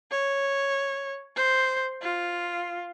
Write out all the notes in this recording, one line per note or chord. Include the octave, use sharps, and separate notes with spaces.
C#5
C5
F4